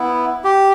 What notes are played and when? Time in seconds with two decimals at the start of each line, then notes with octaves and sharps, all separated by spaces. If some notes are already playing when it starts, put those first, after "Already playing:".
Already playing: B3 E4
0.44 G4